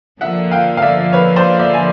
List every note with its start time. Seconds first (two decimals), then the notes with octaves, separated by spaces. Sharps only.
0.21 D3 F3 A#3 E5 F#5
0.51 F5 G5
0.77 F5
0.82 D5 E5
1.13 B4 C#5
1.36 C5 D5
1.59 D5 E5
1.74 G#5